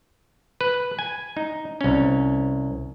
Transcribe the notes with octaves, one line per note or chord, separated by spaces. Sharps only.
B4
G#5
D#4
C2 C#4